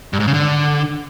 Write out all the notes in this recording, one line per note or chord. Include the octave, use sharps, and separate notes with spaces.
G2
G#2
C#3
D3